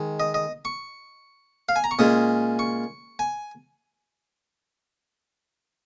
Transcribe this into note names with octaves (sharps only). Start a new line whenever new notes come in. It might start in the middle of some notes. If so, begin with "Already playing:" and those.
Already playing: D#3 G#3
D#5
D#5
C#6
F5
G#5
A#5
C#6
A#2 G#3 C#4 D#6
C#6
G#5